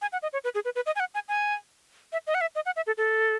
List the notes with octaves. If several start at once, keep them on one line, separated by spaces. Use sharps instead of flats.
G#5
F#5
D#5
C#5
B4
G#4
B4
B4
D#5
G#5
F#5
G#5
G#5
E5
D#5
F#5
E5
D#5
F#5
E5
A4
A4